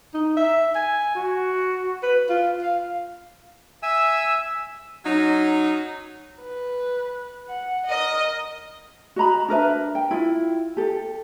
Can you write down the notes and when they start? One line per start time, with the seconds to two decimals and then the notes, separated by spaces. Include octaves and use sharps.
0.14 D#4
0.37 E5
0.75 G#5
1.15 F#4
2.03 B4
2.29 F4
2.62 F5
3.83 E5 G#5 E6
5.05 F#3 C#4 D#4
6.41 B4
7.49 F#5
7.89 A#4 D#5
9.16 F#4 D#5 A#5 B5
9.48 D4 A#4 B4 E5
9.95 G5
10.11 E4 F4
10.77 G4 A4